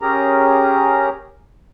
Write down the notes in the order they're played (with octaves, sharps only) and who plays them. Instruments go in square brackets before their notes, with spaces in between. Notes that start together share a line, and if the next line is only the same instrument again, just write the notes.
[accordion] C#4 G4 G#4 A#4 A#5